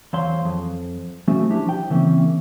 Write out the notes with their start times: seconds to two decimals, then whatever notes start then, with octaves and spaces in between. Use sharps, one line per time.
0.13 E2 C5 C#5 F5 C6
0.45 F2
1.28 F3 A3 C#4 F#4
1.50 D4 E4 G4
1.66 F3 G5
1.90 C#3 E3 A#3 C4 C#4